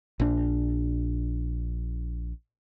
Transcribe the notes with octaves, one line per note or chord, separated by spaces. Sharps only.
A#1 D4